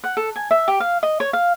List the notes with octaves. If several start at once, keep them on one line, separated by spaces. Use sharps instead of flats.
F#5
A4
G#5
E5
G4
F5
D#5
C#5
F5